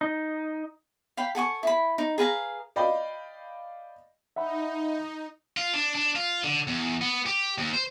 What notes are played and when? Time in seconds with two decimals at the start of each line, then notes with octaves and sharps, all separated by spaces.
0.01 D#4
1.17 F5 G5 B5
1.35 A4 F#5 G#5 C#6
1.63 E4 B5
1.98 D#4
2.18 G#4 B4 F5 A#5
2.76 D5 D#5 F5 G5 B5
4.36 D#4 E5 F#5 B5
5.57 F4
5.74 D4
5.95 D4
6.16 F4
6.44 D3
6.67 E2
7.02 B3
7.26 G4
7.58 D#2
7.74 C5